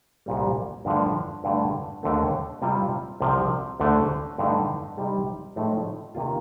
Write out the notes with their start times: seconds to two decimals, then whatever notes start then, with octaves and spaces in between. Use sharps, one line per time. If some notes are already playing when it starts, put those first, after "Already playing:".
0.26 C2 A#2 G3
0.85 G2 D3 F3 A3 D4
1.44 G2 D3 A3
2.03 D#2 D3 A3
2.62 C3 G3 C4 F4
3.20 C2 C3 F3 C4
3.80 D2 D3 A3
4.38 G2 D3 A3 D#4
4.97 C3 G3 C4 D#4
5.56 A2 F3 A3 D#4
6.15 C3 D#3 A#3 F4